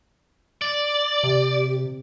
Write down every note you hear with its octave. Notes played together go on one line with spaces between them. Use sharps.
D5
C3 G4